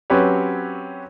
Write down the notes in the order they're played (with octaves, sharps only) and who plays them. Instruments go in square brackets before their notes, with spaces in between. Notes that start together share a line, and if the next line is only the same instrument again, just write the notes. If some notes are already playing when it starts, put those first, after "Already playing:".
[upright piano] F#3 C4 C#4 G4 B4 C#5